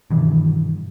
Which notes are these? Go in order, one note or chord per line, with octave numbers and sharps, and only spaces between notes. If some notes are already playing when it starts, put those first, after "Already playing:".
G2 B2 D#3 E3